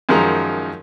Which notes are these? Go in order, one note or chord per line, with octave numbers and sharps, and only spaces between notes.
F#2 D#3 F3 G#3 A#5